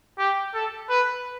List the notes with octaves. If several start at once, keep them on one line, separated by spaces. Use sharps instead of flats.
G4
A4
B4